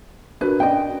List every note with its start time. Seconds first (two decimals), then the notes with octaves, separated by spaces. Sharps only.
0.41 D4 F#4 A#4 B4
0.60 C#4 D4 D5 D#5 G5